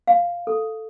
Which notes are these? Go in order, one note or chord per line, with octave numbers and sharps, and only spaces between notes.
F5
A4